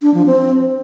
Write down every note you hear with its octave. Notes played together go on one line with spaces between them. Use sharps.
D4
F3
C4